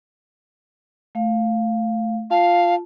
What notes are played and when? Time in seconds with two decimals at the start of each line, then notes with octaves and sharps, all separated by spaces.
1.15 A3 F5
2.31 F4 F5 A5